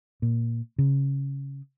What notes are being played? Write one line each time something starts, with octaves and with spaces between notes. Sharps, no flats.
A#2
C#3